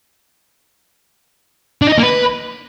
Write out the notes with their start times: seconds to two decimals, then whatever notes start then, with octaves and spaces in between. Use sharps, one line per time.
1.82 D4
1.87 D#4
1.92 D#5
1.98 A#3
2.03 B4